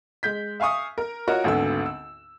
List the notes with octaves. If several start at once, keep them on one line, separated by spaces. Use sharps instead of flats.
G#3 G6 B6
E5 F5 G#5 C#6 D#6
A#4
F4 F#4 A#4 C#5 D#5
G#1 D2 D3 A3 B3 E6
E6